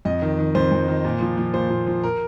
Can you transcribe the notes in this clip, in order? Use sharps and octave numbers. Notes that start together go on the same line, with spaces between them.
F2 D#5
D#3
D#3
F2 C5
F2
D#3
A#2
F3
F3
A#2 C5
A#2
F3
A#4